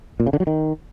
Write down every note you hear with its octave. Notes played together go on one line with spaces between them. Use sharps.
A#2
C#3
D3
F#3
D#3